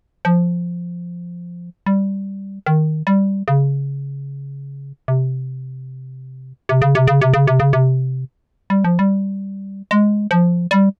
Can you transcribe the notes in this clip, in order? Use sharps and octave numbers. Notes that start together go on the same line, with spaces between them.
F3
G3
D#3
G3
C#3
C3
C3
C#3
C3
C#3
C3
C#3
C3
C#3
C3
G3
F3
G3
G#3
F3
G3